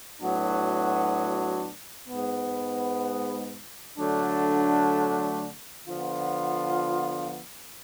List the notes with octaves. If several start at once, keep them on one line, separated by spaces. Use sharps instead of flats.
A2 F#3 B3 D4 F#4
G#2 G#3 B3
D3 F#3 A3 D4
D3 F3 B3 F4